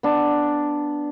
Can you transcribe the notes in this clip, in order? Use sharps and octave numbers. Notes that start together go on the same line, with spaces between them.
B3 D4